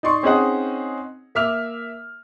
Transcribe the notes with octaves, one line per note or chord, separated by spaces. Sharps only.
D#4 D5 C6 C#6
C4 C#4 D#4 G#4 D#5 F#5
A#3 E5 D6 F6 F7